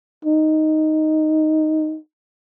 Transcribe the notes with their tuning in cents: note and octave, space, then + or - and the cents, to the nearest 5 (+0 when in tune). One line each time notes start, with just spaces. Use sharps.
D#4 +0